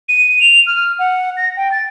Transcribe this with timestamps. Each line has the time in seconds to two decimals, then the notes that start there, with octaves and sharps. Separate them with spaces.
0.09 D#7
0.40 F7
0.67 F6
0.99 F#5
1.37 A#6
1.57 G5
1.72 A6